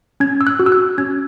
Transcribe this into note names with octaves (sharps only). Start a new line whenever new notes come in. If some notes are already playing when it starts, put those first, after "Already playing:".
C#4 G#6
E6
F#6
F#4
E6
F#6
C#4 G#6